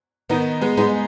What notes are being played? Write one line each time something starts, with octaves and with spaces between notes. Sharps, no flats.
D#3 B3 D#4
G#3 B3
G#3 B3 D#4